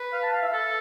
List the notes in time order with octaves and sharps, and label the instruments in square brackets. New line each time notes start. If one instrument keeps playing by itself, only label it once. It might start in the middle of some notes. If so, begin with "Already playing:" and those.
Already playing: [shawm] B4
[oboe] F5
A5
F5
E5
[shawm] A4